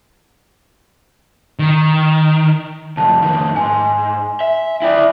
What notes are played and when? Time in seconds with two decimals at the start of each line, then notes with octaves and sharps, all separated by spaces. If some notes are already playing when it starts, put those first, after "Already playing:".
1.59 D#3
2.97 C2 F2 A5
3.22 F2 D#3
3.56 G#2 G#5 C6
4.40 E5
4.82 E4 D5 E5 G5